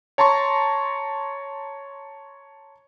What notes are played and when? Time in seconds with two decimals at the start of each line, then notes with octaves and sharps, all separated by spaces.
0.18 C#5 A5 A#5 C6 C#6